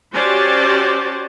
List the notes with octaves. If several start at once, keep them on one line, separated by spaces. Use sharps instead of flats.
C#4 F#4 G4 C5 D5 A5